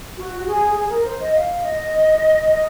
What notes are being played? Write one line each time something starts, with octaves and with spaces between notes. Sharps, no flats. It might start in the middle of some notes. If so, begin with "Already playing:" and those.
F#4
F#4
G#4
G#4
A#4
C5
D#5
F5
D#5
D#5